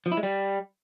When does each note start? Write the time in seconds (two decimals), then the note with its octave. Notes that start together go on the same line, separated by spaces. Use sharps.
0.06 F3
0.12 E4
0.17 G#3
0.23 G3